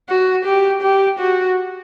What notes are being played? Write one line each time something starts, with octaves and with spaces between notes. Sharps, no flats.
F#4
G4
G4
F#4